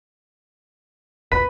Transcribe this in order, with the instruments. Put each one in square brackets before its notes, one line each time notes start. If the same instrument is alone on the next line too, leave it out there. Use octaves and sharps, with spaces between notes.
[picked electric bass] E1 A#1 [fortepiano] B4 [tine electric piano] B6